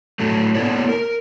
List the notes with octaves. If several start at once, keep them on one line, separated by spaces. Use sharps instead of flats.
A2 F#3 A3
A#3 B3 E4 A4 C#5 D5
A#4